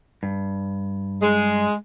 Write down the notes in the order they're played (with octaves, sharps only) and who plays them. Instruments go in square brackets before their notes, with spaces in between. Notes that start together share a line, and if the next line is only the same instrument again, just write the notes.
[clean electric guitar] G2
[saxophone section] G#3